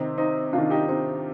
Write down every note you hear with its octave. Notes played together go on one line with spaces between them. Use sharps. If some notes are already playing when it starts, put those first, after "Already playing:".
Already playing: C3 D#3 C4 D#4
C4 D#4
C3 D#3 D4 F4
D#4 G4
C4 D#4